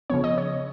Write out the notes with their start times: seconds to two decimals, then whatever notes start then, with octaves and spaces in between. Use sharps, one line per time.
0.10 C#3 F3 B3 C#5
0.24 D#5
0.38 C#5